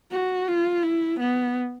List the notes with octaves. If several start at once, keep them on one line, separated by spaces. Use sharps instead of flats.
F#4
F4
E4
B3